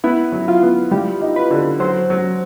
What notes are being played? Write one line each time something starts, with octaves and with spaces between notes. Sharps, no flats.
B3 E4
F#3
F4
B3
G3 G4
D#4
B4
D3
F#3 C5
F#3